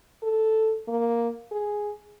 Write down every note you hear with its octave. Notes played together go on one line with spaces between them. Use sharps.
A4
A#3
G#4